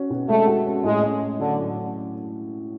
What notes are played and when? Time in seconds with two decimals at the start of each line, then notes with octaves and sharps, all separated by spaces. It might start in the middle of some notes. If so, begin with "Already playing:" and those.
Already playing: C#4 F#4
0.10 B2
0.29 G#3 A3
0.47 F#4
0.66 C#4
0.84 A2 G#3
1.02 C#4
1.21 A2
1.39 D3 F#3
1.58 A2
1.77 C#4